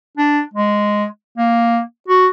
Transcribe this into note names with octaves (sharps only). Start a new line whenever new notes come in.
D4
G#3
A#3
F#4